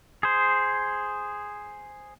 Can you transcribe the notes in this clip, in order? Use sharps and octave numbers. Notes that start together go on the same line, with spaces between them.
G#4 C5